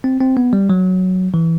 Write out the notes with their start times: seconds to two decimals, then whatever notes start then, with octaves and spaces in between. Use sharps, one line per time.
0.04 C4
0.21 C4
0.37 B3
0.53 G3
0.70 F#3
1.34 E3